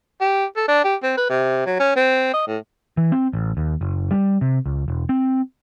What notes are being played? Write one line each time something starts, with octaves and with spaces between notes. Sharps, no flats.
G4
A4
D4
G4
C4
B4
C3
F#3
C#4
C4
D#5
A2
E3
C4
A1
D#2
F#1
G3
C3
C#2
E1
C4